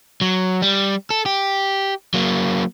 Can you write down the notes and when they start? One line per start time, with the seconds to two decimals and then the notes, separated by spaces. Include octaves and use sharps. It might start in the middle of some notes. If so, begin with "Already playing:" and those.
0.21 F#3
0.62 G3
1.10 A4
1.26 G4
2.14 F#3 A#3